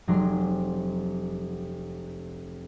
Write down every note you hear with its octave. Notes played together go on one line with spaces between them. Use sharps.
F1 F#3 G#3 D4 C6